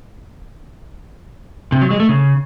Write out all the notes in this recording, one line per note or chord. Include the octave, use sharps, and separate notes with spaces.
C3
F#3
G#3
A3
C#3